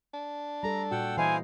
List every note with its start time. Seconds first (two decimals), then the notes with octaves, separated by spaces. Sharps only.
0.14 D4
0.63 G3 A4 A#5
0.91 A#2 F#4 F#5 G5 E6
1.17 E3 E4 C5 D#5 F5 G#5